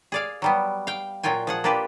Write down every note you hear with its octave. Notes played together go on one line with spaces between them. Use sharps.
G#4 D5 F5
F#3 G3 B3
F5 G5
A#2 F#3 F4 G5 G#5
F3 G#4 F#5
A#3 D4 F4 G4 B4